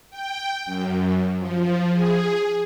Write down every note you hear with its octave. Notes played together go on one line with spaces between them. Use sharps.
G5
F#2
F3
G#4